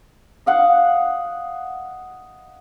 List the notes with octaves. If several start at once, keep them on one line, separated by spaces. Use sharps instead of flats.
D#5 F5 F#5